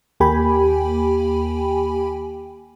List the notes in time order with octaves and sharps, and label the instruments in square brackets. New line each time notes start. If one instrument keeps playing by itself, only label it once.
[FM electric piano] D#2 A#3 G4 G5 G#5 B5